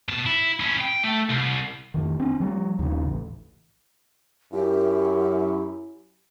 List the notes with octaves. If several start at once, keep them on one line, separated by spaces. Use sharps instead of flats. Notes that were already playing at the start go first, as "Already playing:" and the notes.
B2 A5
E4
C#4 E4
G5
A3
C2
F2 D#3
C4 D4
F3 G3
D#2 C#3
A1
F#2 E4 G4